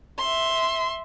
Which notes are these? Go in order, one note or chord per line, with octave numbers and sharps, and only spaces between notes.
E5 C6